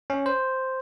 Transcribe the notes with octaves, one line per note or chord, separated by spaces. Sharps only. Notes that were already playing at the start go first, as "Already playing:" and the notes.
C#4
C5